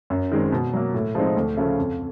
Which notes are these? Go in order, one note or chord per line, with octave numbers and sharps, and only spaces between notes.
F#2
D#3 G#3 C4
B2
F#3 A#3
A2
F3 G#3 C4 D#4
D2
C#3 F3 A3
F2